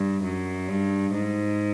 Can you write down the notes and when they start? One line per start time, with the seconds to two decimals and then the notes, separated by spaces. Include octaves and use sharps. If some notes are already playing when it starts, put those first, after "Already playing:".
Already playing: G2
0.24 F#2
0.68 G2
1.13 G#2